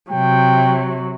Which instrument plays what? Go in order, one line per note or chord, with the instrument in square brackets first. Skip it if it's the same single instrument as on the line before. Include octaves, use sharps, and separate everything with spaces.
[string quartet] C3 F#3 [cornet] G5